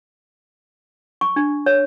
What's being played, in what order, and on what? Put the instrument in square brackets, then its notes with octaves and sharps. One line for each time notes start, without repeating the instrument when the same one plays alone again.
[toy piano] C#6
D4
C#5